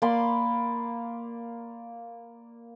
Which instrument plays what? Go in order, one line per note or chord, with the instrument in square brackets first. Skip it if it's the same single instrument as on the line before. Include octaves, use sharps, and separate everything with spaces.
[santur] A#3 D5 B5 C6